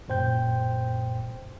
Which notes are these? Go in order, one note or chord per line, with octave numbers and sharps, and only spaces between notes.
F#2 A#2 C5 G5 G6